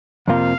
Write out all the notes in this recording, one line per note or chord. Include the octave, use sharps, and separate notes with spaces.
F2 C3 F3 A#3 F4 F5